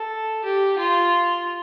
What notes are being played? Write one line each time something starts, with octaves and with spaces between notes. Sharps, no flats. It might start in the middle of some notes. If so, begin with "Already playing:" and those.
Already playing: A4
G4
F4